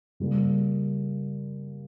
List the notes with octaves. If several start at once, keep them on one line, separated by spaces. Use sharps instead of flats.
C#3 G3 A#3